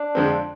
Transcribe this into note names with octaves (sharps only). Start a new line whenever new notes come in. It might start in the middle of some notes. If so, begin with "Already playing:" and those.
Already playing: D4
F2 D3 F3 G#3 C4